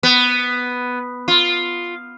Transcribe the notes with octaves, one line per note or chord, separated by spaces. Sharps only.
B3
F4